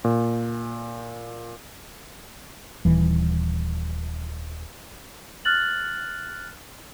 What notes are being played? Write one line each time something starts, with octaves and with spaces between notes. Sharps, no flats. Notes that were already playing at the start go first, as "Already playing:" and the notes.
A#2
D#1 E3
F6 F#6 A6 F#7